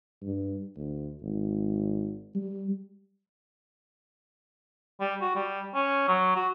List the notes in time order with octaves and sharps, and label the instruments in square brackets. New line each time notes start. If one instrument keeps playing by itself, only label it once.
[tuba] G2
D2
G#1
G3
[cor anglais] G3
F#4
G3
C#4
F#3
F#4